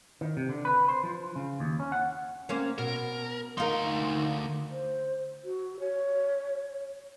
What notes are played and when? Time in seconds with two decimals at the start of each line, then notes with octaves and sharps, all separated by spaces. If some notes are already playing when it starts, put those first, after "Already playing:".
0.21 D#3
0.37 C3
0.49 D3
0.65 B4
0.88 C5
1.03 F3
1.36 C#3
1.60 D#2
1.80 C#4
1.92 F#5
2.49 A#3 C4 C#4
2.78 B2 A#4
3.58 D2 D#4 F4 A#4 C6
4.70 C5
5.44 F#4
5.80 C#5